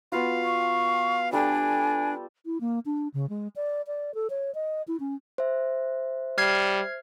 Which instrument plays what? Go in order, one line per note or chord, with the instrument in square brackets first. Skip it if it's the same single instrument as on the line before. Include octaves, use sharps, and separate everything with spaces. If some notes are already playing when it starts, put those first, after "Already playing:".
[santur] B3 F4 F#4 [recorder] F5
[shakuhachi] C#6
[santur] G3 A4 G5 [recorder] D4 [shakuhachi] G#5
[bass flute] E4
A#3
D4
C#3
G#3
D5
D5
A4
C#5
D#5
E4
C#4
[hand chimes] C5 E5
[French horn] G3 [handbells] F6 G#6 C7